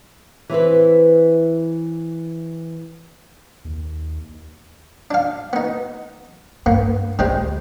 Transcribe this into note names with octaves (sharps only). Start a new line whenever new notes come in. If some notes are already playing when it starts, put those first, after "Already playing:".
E3 C4 E4 B4
D#2
D4 F5
B3 D#4
G2 A#3 B3
D2 G3 G#3 C4